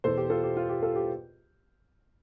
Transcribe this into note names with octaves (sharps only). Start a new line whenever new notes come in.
E2 B2 A4 C5
G4
F4 A4
G4
F4
G4
F4 A4
G4